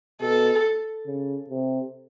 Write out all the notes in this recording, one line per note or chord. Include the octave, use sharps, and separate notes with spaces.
B2 A4
C#3
C3